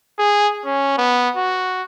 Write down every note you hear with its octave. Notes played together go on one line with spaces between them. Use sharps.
G#4
C#4
B3
F#4